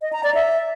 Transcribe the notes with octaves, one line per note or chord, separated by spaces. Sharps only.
D#5
A#5
D5
E5